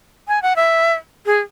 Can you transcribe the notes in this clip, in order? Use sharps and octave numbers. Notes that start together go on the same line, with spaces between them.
G#5
F#5
E5
G#4